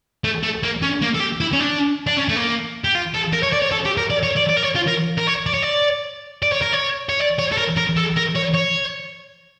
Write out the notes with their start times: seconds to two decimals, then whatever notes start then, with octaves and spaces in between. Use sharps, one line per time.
0.24 A3
0.43 A3
0.63 A#3
0.82 C#4
1.02 A#3
1.15 A4
1.20 G4
1.41 E4
1.53 C#4
1.60 D4
2.07 D4
2.17 C#4
2.29 A3
2.36 A#3
2.84 G4
2.95 F4
3.14 A4
3.33 A#4
3.43 C#5
3.53 D5
3.62 C#5
3.72 A4
3.85 G4
3.98 A#4
4.10 D5
4.23 C#5
4.37 D5
4.49 D5
4.57 A#4
4.63 C#5
4.75 F4
4.87 A#4
5.18 A#4
5.27 C#5
5.46 D5
5.54 C#5
5.63 D5
6.43 D5
6.52 C#5
6.62 A#4
6.73 C#5
7.09 C#5
7.20 D5
7.39 C#5
7.52 A4
7.58 A#4
7.77 A#4
7.97 A4
8.16 A#4
8.36 C#5
8.55 C#5